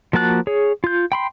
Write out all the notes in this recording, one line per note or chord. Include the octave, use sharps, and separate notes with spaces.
F3 A#3 F#4 A5 F#6
G#4 C#5
F4 G6
G5 B5 C6